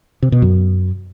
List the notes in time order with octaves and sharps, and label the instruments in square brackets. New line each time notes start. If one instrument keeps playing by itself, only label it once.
[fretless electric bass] C3
B2
F#2